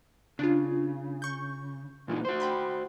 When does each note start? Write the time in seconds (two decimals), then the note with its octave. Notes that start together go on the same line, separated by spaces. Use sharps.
0.39 C#3 D4 F4
1.22 C#6 G6
2.08 A#2 E3 D#4
2.25 F#4 C5
2.40 G5 B5 C6